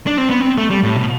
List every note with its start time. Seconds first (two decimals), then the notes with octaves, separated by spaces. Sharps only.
0.07 D4
0.18 C4
0.29 B3
0.41 C4
0.58 A3
0.70 G3
0.83 A2
0.96 B2